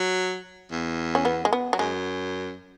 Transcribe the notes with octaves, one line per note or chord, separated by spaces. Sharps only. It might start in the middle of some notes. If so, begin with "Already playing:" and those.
Already playing: F#3
E2
C#4
B3
G#3
B3
F#3
F#2 G#3